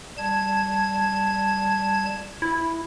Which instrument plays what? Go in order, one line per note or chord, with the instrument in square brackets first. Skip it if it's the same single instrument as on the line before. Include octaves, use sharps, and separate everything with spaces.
[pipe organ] G3 A5 G#6
[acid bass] E4